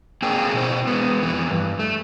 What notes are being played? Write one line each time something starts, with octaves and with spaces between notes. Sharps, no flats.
A#3 C4 G#4 G5
B2 E4 C5
G#3 B3
F2 E3
G2
A3